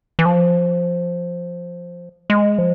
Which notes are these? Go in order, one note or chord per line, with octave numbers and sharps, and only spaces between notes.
E3
F3
G#3
F3